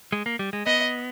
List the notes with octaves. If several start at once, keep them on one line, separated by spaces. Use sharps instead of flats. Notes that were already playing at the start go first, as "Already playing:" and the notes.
G#3
A#3
G3
G#3
B3 D#5